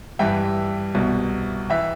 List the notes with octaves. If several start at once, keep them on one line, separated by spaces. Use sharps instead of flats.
G2 E3 E5 G5
C2 B2
E3 E5 G5